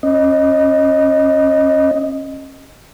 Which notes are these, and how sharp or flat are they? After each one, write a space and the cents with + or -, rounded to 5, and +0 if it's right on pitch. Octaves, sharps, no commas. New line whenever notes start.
C#4 -30 D#5 +0